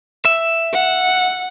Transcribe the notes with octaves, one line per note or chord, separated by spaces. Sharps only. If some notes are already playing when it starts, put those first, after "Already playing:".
E5
F#5